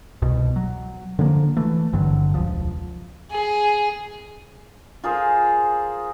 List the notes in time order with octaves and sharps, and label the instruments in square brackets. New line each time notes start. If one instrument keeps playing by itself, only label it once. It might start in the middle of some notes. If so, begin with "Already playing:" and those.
[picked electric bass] C2 B2
F#3
D3 F3 A#3
E3 A3
G#1 G2 D3 F#3
E1 C#2 F3
[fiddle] G#4
[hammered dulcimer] F4 G#4 A#4 C5